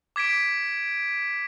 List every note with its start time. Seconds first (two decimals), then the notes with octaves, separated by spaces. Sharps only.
0.16 D6 G#6 B6 D7